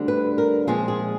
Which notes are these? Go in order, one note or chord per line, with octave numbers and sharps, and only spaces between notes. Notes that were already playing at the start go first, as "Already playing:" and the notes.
Already playing: D2 D3 G3 C4
B4
A#4
A#2 F3 G#3 C4 G#4
G#4